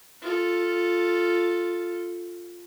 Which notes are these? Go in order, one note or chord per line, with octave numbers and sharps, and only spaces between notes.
F4 A4